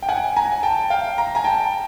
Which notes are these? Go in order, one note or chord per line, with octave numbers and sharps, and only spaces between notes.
G5
F#5 G#5
G#5 A#5
G5 A5
F5 G5
A#5
G#5 A#5
G5 A5